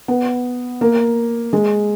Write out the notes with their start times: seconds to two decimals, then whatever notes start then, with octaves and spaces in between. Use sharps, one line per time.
0.08 B3
0.81 A#3
1.53 G#3